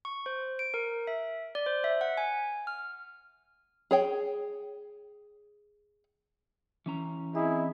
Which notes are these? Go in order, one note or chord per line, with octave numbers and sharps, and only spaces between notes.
C#6
C5
D7
A#4
E5
D5
C5
E5
F#5
G#5
F6
G#4 C#5 G5
E3 C#4 A#5
C4 E4 G#4 D#5